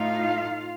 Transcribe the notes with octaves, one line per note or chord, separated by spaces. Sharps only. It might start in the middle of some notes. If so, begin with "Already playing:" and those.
Already playing: A2 A3 D#4 F4 F5